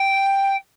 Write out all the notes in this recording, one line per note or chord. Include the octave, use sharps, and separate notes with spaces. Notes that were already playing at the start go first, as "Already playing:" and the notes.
Already playing: G5